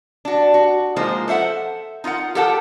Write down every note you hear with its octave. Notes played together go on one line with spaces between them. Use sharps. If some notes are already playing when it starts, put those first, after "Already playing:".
D4 F#4
F#4
F3 G#3 A#3 D#4 F4 C5
A4 C5 E5 F#5
D#4 F4 A#4 F#5
G4 A4 A#4 F#5 G5 A5